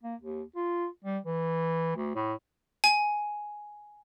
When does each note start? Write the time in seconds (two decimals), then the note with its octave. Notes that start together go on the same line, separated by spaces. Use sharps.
0.03 A#3
0.21 D#2
0.56 F4
1.05 G3
1.25 E3
1.96 D2
2.15 A2
2.84 G#5